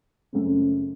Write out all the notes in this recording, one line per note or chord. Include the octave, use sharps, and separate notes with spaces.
F#2 C#3 A3 C4